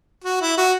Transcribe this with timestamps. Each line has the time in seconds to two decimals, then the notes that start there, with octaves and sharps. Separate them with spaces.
0.24 F#4
0.41 E4
0.58 F#4